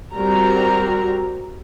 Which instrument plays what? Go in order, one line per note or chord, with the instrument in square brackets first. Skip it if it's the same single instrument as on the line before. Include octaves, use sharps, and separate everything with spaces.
[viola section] G3 C4 F#4 G4 A#4 A#5